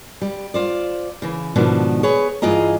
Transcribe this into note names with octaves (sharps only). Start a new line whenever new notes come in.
G3
F4 C5 D5
C#3 E3
G#2 B2 D#3 F3 D4
G#4 B4 C#5
G2 E3 F4 G#4 D#5 A#5